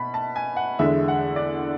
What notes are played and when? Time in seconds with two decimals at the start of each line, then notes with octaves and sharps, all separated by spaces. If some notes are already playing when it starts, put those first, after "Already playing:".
Already playing: B2 B5
0.14 A5
0.36 G#5
0.57 F#5
0.79 E2 D3 G#3 E5
1.08 F#5
1.36 D5